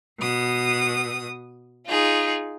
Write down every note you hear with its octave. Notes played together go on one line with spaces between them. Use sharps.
B2 D#6
D#4 F4 G#4